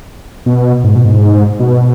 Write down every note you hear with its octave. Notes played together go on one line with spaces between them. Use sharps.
B2
G#2
B2
G#2
B2